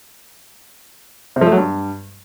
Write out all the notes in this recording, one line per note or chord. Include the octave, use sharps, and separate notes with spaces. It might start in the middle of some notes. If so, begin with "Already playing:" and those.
C3
F3
A3
F#3
G2